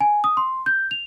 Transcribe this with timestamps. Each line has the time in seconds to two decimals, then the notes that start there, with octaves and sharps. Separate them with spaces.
0.01 G#5
0.24 D#6
0.37 C6
0.66 G6
0.91 F7